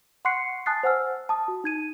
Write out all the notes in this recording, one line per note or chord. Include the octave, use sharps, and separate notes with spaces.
F#5 C6 C#6 F#6 C7 C#7
G#5 A5 D#6 F#6 A6 C7
C5 F#5 G#5 E6 F6
A5 D#6
F#4
D#4 G#6 D#7